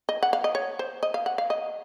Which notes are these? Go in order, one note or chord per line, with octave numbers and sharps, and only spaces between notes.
D#5
F#5
F5
D#5
C#5
C5
D#5
F5
F#5
F5
D#5